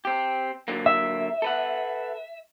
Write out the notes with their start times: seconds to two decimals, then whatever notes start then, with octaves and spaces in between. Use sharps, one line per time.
0.05 C4 G4
0.68 D3 F#3 A#3
0.86 E5
1.42 A4 B4 F#5